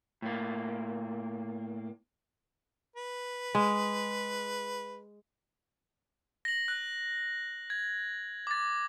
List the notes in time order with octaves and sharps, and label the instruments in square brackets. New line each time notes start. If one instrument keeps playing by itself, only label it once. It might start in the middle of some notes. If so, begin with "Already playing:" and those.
[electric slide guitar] A2 A#3
[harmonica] B4
[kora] G#3
[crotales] A#6 F#7
F#6
G#6
D6 A6